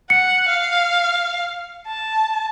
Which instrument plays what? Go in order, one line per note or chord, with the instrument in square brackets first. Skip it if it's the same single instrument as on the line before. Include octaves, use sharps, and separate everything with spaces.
[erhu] F#5 [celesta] C#7
[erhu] F5
A5